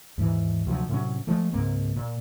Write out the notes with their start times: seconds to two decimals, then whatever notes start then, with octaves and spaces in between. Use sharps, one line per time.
0.18 D#2 G#2 E3
0.67 D2 C3 F3 F#3
0.89 A2 C3 F#3 C#4
1.27 F3 G#3 A3
1.53 C#2 G#2 A#3 C4
1.96 A#2